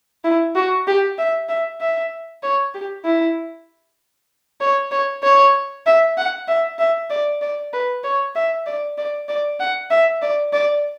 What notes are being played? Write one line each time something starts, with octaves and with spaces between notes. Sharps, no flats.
E4
F#4
G4
E5
E5
E5
C#5
G4
E4
C#5
C#5
C#5
E5
F#5
E5
E5
D5
D5
B4
C#5
E5
D5
D5
D5
F#5
E5
D5
D5